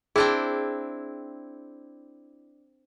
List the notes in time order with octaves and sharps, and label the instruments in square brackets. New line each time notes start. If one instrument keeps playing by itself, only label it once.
[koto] C4 D4 E4 [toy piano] G#4